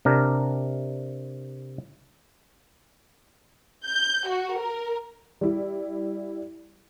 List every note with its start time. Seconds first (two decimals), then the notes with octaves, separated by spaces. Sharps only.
0.05 C3 D4 A#4
3.86 G6
4.28 F#4
4.59 A#4
5.41 G3 E4